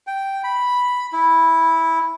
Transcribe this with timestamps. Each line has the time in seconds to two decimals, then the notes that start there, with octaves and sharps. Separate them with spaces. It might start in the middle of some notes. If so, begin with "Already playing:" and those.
0.07 G5
0.44 B5
1.13 E4